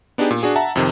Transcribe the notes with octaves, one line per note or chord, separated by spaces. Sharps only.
B3 D4 D#4 G4 G#4
A#2
D4 F#4 G#4
E5 F#5 A5 A#5
F2 C3 D#3